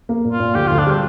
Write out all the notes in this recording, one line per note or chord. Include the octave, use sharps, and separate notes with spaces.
A#3
A#2
F4
A#2
D2 G4
D2 F4
D4
G3 C4